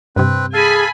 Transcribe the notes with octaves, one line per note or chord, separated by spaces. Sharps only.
G2 C3 C4 B4
G#4 A4 F5 G#5 B5